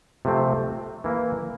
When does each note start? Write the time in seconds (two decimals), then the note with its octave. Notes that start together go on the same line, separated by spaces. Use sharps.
0.25 C3 F3 A3 C4
1.04 E3 A#3 E4